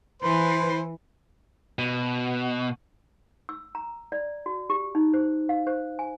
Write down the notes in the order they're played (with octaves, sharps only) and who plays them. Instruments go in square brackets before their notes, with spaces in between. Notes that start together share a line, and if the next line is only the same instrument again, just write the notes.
[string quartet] E3 [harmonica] B4 C5 C6
[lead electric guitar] B2
[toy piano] E6
A#5
D5
F#4
G4
D#4
C5
F5
C5
G#5